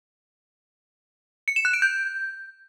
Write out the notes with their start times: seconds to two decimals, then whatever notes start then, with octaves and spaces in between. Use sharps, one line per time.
1.48 C#7
1.56 E7
1.65 F#6
1.74 D7
1.82 G6